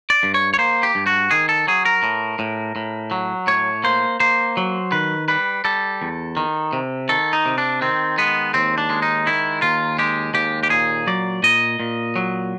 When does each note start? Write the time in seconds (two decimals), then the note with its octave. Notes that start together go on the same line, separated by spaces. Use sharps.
0.10 D5
0.23 G2
0.34 C#5
0.54 C#5
0.58 A#3 C5
0.83 G4
0.95 G2
1.06 F#4
1.31 D#3 G#4
1.49 A4
1.67 F#3 G#4
1.85 A#4
2.03 A2
2.39 A2
2.76 A2
3.11 F#3
3.47 A2 C#5
3.84 A#3 C5
4.20 A#3 C5
4.57 F#3
4.92 D#3 B4
5.28 G3 B4
5.65 G3 A4
6.02 E2
6.37 D#3
6.73 C3
7.09 D#3 A4
7.33 D#4
7.45 C3
7.58 D4
7.81 D#3 C4
8.18 G#3 B3
8.54 D#2 C4
8.78 D4
8.90 G#3
9.02 D#4
9.27 D#3 E4
9.62 D#2 F4
9.99 G#3 G4
10.34 D#2 G4
10.63 G4
10.70 A#2 G#4
11.07 F#3 D5
11.43 A#2 D#5
11.80 A#2
12.16 F#3